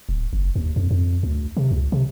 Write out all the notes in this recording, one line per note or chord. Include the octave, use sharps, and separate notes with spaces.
D1
F#1
D#2
F2
F2
D2
C3
C#2
C3